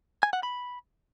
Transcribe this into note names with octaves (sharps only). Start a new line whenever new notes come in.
G#5
F#5
B5